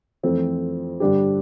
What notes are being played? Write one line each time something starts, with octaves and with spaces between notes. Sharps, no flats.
F2 E3 A3 C4
G2 D3 G3 D4 G4